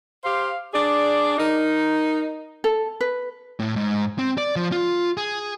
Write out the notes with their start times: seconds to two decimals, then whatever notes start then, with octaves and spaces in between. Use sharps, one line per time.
0.24 G4 C5 F5
0.74 D4 G#4 D5
1.38 D#4 A#4
2.64 A4
3.01 B4
3.59 A2
3.76 G#2
4.19 C4
4.38 D5
4.56 F3
4.72 F4
5.17 G#4